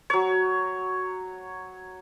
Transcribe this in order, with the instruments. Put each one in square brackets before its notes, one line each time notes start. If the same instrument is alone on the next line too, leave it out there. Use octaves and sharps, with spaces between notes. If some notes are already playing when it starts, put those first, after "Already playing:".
[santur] F#3 C#5